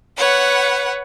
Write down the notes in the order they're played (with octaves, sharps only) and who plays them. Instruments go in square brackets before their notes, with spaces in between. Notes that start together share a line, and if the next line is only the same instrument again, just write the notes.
[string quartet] B4 C#5 F#5